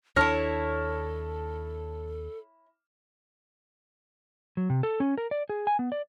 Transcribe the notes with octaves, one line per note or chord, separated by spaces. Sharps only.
D#2 D4 E4 A4 C#5 A5 F6 A#6
F#3
C3
A4
C#4
A#4
D5
G#4
G#5
B3
D5